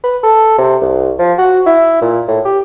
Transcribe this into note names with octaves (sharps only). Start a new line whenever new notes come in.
B4
A4
C3
C2
F3
F#4
E4
A#2
A2
G4